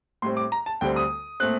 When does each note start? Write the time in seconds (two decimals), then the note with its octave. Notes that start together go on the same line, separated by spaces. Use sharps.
0.22 A2 G3 C4 C6
0.37 D6
0.52 A#5
0.66 A5
0.81 D2 D3 G3 C4 G5
0.96 D#6
1.40 A#2 A3 C4 F#6